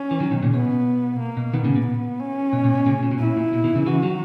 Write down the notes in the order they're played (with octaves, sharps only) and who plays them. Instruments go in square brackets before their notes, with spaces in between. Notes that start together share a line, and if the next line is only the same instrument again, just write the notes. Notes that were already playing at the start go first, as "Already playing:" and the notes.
Already playing: [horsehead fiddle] C#4
[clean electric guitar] E3
D#3 F#3
B2 D#3
A#2 C#3
[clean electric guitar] B2 [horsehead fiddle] B3
[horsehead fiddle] A#3
[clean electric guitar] B2
[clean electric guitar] B2 D#3 [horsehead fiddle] B3
[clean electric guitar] A#2 C#3
A#2
[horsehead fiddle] B3
C#4
[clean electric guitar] B2
A#2
B2
A#2 C#3
A#2
B2
[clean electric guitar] A#2 [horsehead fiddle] E4
[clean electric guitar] A#2
B2
B2 D#3
C#3 E3
[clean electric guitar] C#3 E3 [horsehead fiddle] F#4
[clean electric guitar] D#3 F#3